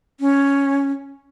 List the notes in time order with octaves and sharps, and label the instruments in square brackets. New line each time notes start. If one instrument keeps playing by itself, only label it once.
[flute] C#4